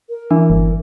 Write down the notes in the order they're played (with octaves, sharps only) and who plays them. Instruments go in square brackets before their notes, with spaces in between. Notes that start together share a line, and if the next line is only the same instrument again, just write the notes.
[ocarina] A#4
[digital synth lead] E3 [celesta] D4
[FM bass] G1